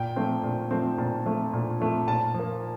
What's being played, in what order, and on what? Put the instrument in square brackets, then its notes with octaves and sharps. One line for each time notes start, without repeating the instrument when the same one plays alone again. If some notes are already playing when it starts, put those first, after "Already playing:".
Already playing: [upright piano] A#2 G5
F3 A3 C4
A#2
F3 A3 C4
A#2 A5
F3 A3 C4
A#2
F3 A3 C4
A#2 A5
F3
A#3